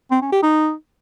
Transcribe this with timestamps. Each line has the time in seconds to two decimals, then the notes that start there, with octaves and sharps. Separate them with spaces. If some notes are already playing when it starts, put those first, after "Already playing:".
0.11 C4
0.22 C#4
0.32 G4
0.43 D#4